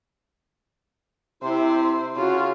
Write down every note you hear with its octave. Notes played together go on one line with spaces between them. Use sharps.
C3 E4 C5
C#3 F4 F#4